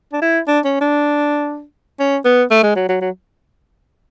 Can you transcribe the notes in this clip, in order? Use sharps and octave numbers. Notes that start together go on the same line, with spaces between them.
D4
E4
D4
C#4
D4
C#4
B3
A3
G#3
F#3
F#3
F#3